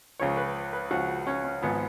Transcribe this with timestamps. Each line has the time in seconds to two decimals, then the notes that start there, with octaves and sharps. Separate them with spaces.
0.19 C#2 C#3 F3 C#5
0.37 B4
0.73 B4
0.91 C#2 C#3 F3 F#4
1.27 C#4
1.44 C#4
1.62 G#1 G#2 F3 B3